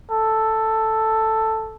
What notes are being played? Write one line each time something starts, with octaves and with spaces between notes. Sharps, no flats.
A4